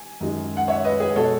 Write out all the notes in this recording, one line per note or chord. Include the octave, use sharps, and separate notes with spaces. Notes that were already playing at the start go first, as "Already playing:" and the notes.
Already playing: G#5
F#2 D#3 G#3
F#5
C#5 E5
B4 D#5
G#4 B4
B2 G#3 A4 C#5